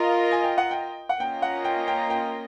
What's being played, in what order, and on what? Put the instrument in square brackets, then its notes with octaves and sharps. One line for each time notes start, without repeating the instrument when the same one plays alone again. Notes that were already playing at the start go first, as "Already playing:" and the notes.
Already playing: [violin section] F4 A#4 D#5 [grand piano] F5
[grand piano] G#5
G5
F#5
G5
F#5
[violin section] A#3 C#4 F4 A#4 D#5 [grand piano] G5
[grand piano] F#5
G5
G5
G5